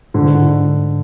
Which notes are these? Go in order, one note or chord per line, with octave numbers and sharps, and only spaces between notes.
G#2 D3
D3